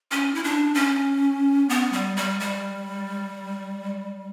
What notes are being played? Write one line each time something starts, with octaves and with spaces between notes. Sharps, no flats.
C#4
E4
D4
C#4
B3
G3
G3
G3